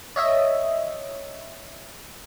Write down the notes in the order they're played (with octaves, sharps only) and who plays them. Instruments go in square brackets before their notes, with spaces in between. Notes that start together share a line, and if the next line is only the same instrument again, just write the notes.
[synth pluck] C#5 D#5 E5